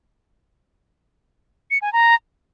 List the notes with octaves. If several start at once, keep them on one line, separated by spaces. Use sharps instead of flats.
C#7
G#5
A#5